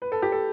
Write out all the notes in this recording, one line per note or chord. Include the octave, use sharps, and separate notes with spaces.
B4
A4
G4
A4